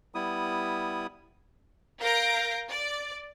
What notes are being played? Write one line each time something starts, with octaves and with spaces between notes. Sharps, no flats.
G3 B3 E4 D#6
A#4 F5 G6 A#6 D7
D5